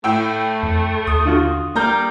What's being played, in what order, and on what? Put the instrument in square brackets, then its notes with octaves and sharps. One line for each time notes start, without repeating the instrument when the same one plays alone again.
[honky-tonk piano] A2 G5 E6 [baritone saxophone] A3
[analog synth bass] F2
[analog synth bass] D#2 [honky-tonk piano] D#6
[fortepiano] D3 F4 F#4
[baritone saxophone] G3 [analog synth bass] A#3 [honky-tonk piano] A#4 A#5 G6